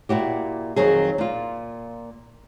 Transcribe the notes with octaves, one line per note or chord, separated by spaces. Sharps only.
A#2 E4 F#4 G4
F2 D#3 F#3 G#4
A#2 F4